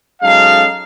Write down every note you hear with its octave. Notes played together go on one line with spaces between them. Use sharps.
F#3 G#3 C#4 D#4 A4 F5